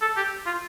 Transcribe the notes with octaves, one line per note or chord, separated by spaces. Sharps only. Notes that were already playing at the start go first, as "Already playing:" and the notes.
A4
G4
F4